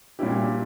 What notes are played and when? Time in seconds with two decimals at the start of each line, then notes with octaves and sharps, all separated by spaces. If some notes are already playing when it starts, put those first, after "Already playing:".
0.19 A#2 G3 C#4 E4 G4